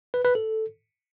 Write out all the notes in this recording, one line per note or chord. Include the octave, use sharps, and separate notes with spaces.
B4
B4
A4